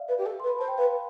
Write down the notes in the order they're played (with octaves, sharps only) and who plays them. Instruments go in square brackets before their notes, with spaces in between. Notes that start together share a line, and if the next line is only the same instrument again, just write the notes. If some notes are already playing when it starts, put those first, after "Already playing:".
Already playing: [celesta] D5 E5 F5
[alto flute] B4
G4
A4
[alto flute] B4 [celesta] C6
[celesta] B5
[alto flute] C5 [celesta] A5
[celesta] G5
[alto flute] B4 [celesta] F5